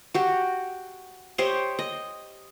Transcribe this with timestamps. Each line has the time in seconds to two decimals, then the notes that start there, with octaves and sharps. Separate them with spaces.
0.14 F#4 G4
1.38 G4 C5 C#5 D#5
1.79 D#5